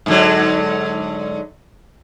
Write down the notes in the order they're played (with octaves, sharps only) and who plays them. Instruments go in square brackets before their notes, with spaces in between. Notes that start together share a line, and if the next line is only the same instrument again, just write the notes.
[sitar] G#2 D3 F#3